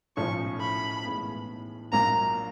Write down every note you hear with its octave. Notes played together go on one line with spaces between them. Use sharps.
B1 A2 F3 A3 C#4 C#6
B5
B1 A2 E3 G#3 B3
A#1 A#2 F#3 A#3 D4 A#5